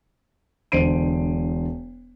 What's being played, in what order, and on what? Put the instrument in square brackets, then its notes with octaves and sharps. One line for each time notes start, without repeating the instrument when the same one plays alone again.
[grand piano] E1 D3 C5 C7 D7 D#7